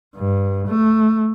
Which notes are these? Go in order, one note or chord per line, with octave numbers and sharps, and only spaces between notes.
G2
A3